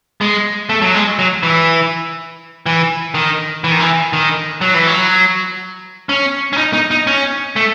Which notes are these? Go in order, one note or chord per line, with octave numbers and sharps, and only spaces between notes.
G#3
A3
F#3
G#3
F#3
E3
E3
D#3
E3
D#3
E3
D#3
F#3
E3
F#3
C#4
C#4
D#4
D#4
D#4
C#4
A3